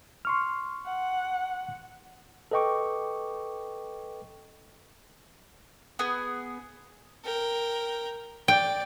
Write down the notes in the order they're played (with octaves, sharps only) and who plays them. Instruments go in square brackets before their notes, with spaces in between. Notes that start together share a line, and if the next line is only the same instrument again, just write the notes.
[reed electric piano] C6 C#6 F6
[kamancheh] F#5
[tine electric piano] A4 B4 D#5 G5 C#6 D6
[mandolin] B3 G#4
[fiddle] A#4 G5
[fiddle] D5 [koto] G5